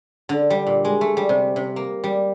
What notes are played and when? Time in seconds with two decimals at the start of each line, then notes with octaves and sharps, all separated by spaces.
0.29 D3
0.50 G3
0.67 A#2
0.85 G#3
1.01 A3
1.17 G3
1.29 C3
1.56 C3
1.76 A#3
2.04 G3